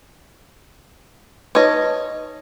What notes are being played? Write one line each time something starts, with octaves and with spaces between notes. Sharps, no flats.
D#4 B4 C#5 D#5 D#6